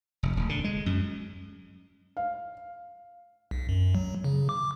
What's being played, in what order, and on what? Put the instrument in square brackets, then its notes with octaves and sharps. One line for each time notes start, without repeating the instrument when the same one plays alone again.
[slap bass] F1
D1
D3
G#3
F#2
[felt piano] F5
[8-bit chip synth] B1
F#2
F#3
C#3
D6